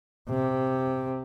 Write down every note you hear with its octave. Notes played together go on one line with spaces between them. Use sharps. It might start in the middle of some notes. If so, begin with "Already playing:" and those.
C3